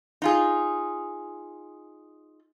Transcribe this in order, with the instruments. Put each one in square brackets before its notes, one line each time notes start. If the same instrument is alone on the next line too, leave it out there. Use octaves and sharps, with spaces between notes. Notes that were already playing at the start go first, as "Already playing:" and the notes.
[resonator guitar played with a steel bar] D#4 F4 G#4